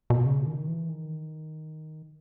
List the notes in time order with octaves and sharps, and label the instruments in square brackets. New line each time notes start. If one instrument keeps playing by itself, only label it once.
[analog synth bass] B2
C#3
D#3
E3
D#3